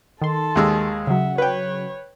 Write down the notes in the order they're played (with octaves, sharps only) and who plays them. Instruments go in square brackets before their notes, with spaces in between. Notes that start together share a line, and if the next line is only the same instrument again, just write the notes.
[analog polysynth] D#3 C6 [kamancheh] A4 A5
[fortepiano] D#2 G#3 E6
[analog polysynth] C#3 F#3 [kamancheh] E5 F#5
[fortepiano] B4 G5 [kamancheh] C#5